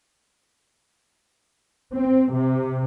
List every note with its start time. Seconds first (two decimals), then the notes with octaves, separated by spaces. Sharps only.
1.96 C4
2.32 C3